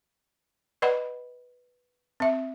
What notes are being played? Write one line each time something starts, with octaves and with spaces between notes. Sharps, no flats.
B4 D5 D#5 F#5 B5
C4 E5